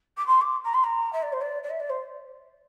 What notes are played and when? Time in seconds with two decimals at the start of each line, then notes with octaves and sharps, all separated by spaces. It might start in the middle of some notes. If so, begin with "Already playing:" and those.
0.17 D6
0.26 C6
0.41 D6
0.64 A#5
0.74 C6
0.83 A#5
1.12 E5
1.22 D5
1.32 C5
1.41 D5
1.63 D5
1.70 E5
1.79 D5
1.89 C5